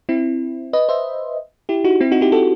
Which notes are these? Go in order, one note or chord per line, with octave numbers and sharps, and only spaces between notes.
C4 E4
B4 D#5
C5 E5
E4 G4
D#4 F#4
C4 E4
D#4 F#4
E4 G4
F#4 A4